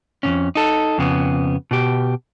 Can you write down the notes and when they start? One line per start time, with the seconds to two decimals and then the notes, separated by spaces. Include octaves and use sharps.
0.23 F2 G#2 C#4
0.55 D#4 A4
0.98 F2 C#3 B3
1.71 B2 G4